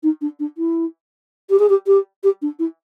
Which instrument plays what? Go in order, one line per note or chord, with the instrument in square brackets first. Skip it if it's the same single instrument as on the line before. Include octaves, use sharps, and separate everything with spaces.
[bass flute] D#4
D4
D4
E4
G4
G#4
G4
G4
G4
D4
E4